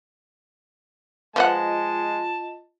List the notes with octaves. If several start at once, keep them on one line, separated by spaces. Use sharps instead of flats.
F3 G#3 F4 B4 D#5 F#5 A5